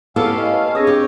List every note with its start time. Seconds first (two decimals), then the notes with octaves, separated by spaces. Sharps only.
0.16 B3 C#4 E4 G4 A4 F5 A5 E6
0.38 D#5
0.53 B4
0.75 C4 D4 G#4 C#5 D#6 E6 A#6
0.87 G4